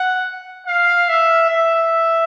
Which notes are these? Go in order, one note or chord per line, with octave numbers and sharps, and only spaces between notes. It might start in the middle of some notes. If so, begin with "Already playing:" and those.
Already playing: F#5
F5
E5
E5